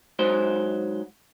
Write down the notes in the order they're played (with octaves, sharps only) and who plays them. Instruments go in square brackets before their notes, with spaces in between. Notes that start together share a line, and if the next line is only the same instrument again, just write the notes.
[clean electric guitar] G#2 F#3 C5